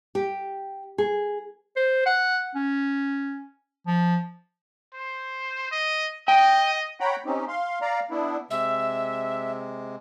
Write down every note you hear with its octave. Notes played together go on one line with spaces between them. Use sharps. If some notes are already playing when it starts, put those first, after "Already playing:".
G4
G#4
C5
F#5
C#4
F3
C5
D#5
D#5 G5
C#5 F#5 G5 A#5 B5
C4 C#4 D#4 G4
F5 C6
D5 F5 A#5
B3 D4 E4
C3 G#3 E5